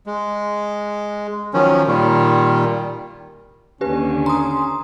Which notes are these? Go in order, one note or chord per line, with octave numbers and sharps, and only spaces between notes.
G#3
D#3 F3 F#3 C#4
A#2 D#3 G3
D#2 D3 C#4 G4 B4
A#5 C6 D#6